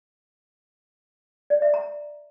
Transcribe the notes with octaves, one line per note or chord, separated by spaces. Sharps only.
D5
E5
A#5